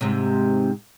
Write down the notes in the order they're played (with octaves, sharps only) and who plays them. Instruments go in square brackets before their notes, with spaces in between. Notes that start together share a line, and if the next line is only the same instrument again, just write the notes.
[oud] G#2 C3